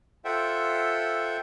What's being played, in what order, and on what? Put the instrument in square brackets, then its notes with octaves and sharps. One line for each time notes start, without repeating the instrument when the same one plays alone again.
[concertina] F4 A4 C5 E5 F#5 G5